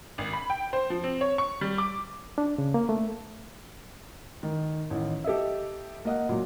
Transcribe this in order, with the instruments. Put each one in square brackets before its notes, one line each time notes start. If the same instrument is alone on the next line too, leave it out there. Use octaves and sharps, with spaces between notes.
[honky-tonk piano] G#1
B5
G5
C5
F3
C4
C#5
C#6
G3
D6
[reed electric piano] D4
C#3
A#3
A3
[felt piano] D#3
A1 D#3
G4 A4 D#5 E5
A#3 D#5 F#5
A#2 F#3